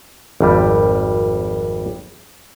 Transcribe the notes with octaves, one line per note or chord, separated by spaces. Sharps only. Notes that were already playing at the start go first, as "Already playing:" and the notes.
G#1 F2 G3